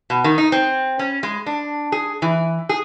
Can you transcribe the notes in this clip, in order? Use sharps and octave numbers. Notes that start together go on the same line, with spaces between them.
B2
D#3
D#4
C4
C#4
G#3
D4
G#4
E3
G#4